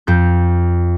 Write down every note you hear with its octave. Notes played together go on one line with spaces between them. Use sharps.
F2 G6